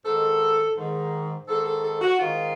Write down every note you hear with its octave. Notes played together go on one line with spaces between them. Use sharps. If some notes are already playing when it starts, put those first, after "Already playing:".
G#2 D#3 A4
G#2 D#3
G#2 D#3 A4
A4
A4
F#4
G#2 D#3 F4